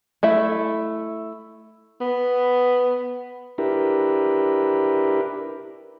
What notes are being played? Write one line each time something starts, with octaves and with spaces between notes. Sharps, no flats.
A3 E4 E5
B3
D4 E4 G4 A#4 B4